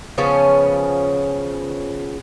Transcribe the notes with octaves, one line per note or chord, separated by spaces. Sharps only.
C#3 F3 B3 C#4